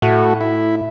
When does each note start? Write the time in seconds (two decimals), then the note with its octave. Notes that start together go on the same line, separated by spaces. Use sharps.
0.02 A2 A3 F#4
0.41 E4